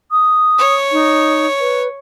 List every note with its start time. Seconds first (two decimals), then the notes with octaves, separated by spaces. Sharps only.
0.11 D#6
0.58 C#5
0.92 D#4
1.60 B4